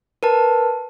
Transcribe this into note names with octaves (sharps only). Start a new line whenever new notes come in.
A#4 B4 A5